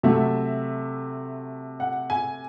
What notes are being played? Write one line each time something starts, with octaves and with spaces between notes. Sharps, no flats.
C3 F#3 A3 E5
F#5
G#5